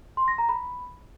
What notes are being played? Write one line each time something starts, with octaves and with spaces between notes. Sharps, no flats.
C6
A#6
A#5
B5